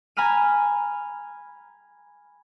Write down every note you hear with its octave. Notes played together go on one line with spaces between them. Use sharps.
G#5 A#5 B5 F6 D#7